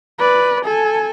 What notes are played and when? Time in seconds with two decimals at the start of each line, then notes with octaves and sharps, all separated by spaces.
0.19 B4 D5
0.65 A4 G#5